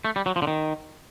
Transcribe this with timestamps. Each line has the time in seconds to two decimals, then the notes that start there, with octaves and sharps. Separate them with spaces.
0.05 A3
0.16 G3
0.26 F#3
0.36 F3
0.42 D3
0.47 D#3